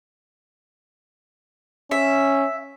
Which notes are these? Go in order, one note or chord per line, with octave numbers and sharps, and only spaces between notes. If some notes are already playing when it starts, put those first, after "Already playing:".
C#4 E5